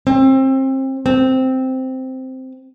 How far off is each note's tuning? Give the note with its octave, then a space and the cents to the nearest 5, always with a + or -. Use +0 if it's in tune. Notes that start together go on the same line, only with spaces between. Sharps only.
C4 +30
C4 -5